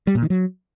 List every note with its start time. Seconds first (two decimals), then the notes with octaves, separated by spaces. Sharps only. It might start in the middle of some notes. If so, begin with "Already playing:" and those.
0.07 G3
0.15 A#2
0.23 D#3
0.30 F#3